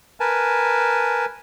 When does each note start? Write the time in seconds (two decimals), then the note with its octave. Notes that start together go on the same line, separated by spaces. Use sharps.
0.20 A#4 B4 G#5 A5